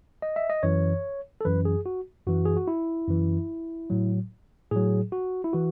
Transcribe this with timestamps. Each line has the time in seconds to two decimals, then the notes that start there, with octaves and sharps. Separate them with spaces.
0.22 D#5
0.36 E5
0.50 D#5
0.63 F#2 E3 C#5
1.41 A4
1.45 F#2 E3 B4
1.65 G#4
1.86 F#4
2.27 F#2 E3 F#4
2.45 G#4
2.57 F#4
2.68 E4
3.08 F#2 E3
3.90 A2 F#3
4.71 A2 F#3 G#4
5.12 F#4
5.44 E4
5.53 E3 F#4